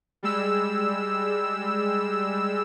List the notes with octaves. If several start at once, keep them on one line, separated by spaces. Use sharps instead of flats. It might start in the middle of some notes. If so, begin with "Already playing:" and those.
G3 G#3 E6